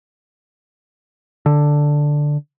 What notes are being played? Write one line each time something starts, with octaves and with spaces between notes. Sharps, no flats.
D3